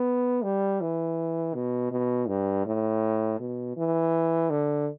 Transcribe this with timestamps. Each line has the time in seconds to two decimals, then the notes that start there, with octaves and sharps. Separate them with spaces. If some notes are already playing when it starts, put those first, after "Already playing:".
Already playing: B3
0.44 G3
0.81 E3
1.55 B2
1.92 B2
2.28 G2
2.66 A2
3.40 B2
3.77 E3
4.50 D3